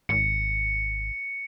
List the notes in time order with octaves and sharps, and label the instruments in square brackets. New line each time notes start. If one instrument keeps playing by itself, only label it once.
[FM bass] G#1 [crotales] C#7